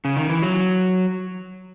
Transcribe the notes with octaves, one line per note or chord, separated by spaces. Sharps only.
C#3
D#3
E3
F#3